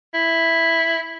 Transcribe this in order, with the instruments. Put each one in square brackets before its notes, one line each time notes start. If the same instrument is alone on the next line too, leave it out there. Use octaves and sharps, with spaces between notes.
[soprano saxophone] E4